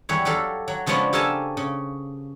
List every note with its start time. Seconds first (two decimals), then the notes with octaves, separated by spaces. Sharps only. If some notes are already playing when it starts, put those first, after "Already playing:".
0.09 E2 G3 C#5
0.25 F#3 G4 A4 F5
0.68 F#3
0.86 C#3 F3 G#3 B3 C#4 D4
1.13 G4 A4 A#4 F5 G#5 A5
1.57 C#3